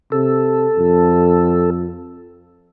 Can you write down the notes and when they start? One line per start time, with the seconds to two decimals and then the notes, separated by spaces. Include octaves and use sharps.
0.12 C3 A4
0.78 F2